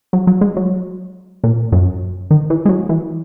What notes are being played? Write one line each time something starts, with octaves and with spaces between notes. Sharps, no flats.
F#3
F#3
G#3
F#3
A#2
F#2
D#3
E3
G#3
F#3
E3